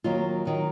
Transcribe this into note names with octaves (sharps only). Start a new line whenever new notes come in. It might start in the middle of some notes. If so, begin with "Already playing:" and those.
D#2 D#3 F#3 F4
D#3 F#3